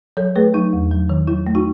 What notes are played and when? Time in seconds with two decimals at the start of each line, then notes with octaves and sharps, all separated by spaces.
0.17 F#3 A4 C#5
0.36 A3 G#4 B4
0.54 F#3 D#4
0.73 E2
0.91 F#3
1.09 D#3
1.27 F#3 E4
1.47 A3
1.55 D#4 F#4